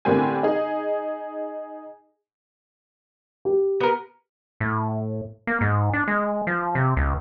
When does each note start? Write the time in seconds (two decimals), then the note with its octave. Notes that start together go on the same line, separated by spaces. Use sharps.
0.05 A2 D3 A#3 C4 G4 G#5
0.43 D#4 G#4
3.45 G4
3.80 B3 A#4
4.60 A2
5.47 A#3
5.61 G#2
5.93 D4
6.08 G#3
6.47 F3
6.75 C3
6.97 C#2